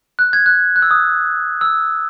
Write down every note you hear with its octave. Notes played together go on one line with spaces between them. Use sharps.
F#6
G#6
F#6
F#6
E6
D#6
E6